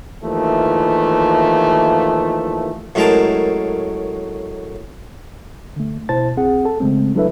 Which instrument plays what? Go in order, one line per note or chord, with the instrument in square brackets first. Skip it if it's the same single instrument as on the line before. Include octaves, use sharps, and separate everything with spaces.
[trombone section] D#2 E3 F3 A3
[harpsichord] F#2 A2 G#3 A#4 G5 A5
[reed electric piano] D3 A3
B2 E4 C5 A5 A6
C2 C4 G#4 F#5
A4 A5
C#3 G#3 A3 C4
F#3 D4 E4 A4 B4 E5